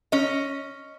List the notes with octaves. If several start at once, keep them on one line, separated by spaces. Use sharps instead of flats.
C#4 D#5